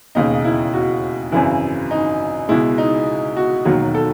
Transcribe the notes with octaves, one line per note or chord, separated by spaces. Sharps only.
E1 D#2 C#3 D#4
E4
F#4
G#1 F#2 C#3 E3 E4
D#4
C#2 B2 G#3 E4
D#4
F#4
E1 D#2 D#3 F#3 F#4
A4